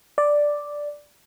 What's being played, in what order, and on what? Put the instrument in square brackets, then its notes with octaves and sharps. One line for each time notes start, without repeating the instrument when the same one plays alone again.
[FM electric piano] D5